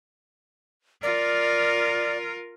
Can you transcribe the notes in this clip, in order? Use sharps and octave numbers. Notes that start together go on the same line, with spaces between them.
F4 A#4 D5